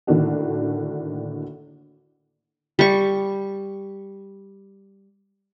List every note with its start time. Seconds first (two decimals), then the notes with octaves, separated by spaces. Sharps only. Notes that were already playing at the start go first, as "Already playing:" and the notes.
0.07 A2 D3 D#3 A#3 D4 F#4
2.79 G3 C#6